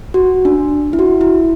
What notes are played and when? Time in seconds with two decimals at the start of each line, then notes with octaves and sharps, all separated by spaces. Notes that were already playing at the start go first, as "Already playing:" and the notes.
0.14 F#4
0.45 D4
0.93 E4
0.99 F#4
1.21 E4